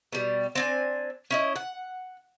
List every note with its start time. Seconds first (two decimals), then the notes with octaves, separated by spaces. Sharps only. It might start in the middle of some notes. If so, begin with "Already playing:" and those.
0.13 B2 G3
0.55 C4 D4 G#5
1.31 C#4 E4 D#5
1.56 F#5